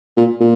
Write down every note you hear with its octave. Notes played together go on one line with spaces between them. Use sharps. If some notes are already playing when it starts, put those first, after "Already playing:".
A#2
A#2